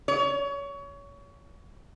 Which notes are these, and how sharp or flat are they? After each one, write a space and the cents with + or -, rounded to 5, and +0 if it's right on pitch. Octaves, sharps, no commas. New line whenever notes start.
C#5 +25